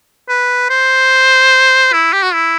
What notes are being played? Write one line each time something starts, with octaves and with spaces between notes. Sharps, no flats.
B4
C5
E4
G4
F#4
E4